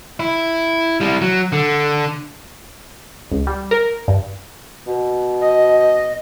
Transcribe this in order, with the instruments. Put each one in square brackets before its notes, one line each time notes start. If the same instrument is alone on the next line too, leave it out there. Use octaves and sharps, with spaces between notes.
[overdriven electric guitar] E4
G3 E4
F#3
D3
[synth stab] C#2
G3
A#4
G2
[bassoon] B2
[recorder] D#5